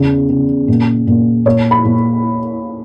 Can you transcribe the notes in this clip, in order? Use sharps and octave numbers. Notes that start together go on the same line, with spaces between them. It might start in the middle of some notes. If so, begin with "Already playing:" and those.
Already playing: E2 C#3
C#3
A#2
A#2
A#2 C#5
B5
A#2